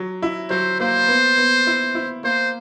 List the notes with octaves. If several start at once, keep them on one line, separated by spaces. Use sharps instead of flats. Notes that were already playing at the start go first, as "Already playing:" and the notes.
Already playing: F#3
E4
F#3 C5
A#3 C5
B3
B3
E4
E4
A#3 C5